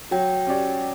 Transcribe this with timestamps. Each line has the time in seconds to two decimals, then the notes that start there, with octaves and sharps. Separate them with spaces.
0.11 F#3 G5
0.47 C#4 G4 D5